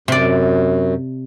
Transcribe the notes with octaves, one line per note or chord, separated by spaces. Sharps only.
F#2 C3 D5